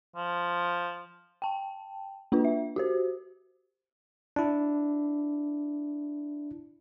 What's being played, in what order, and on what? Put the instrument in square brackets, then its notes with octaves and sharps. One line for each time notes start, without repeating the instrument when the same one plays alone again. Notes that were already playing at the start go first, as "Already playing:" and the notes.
[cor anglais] F3
[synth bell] G5 A5
A#3 D4 F4 B4
E5
F#4 G4 C5
[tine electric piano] D4 E4